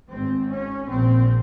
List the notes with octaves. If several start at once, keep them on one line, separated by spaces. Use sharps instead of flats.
G#1 G#2 C4
C#4
A#1 A#2 C4